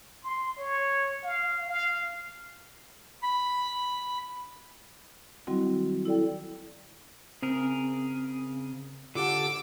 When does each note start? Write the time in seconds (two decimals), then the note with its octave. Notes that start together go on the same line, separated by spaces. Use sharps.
0.23 C6
0.59 C#5
1.24 F5
1.69 F5
3.23 B5
5.47 D#3 F#3 G3 C4 E4 F#4
6.06 E4 A4 D5 G5
7.42 C#3 C4 G#4 A#4
9.15 D3 F4 G4 A4 F#5 D6 E6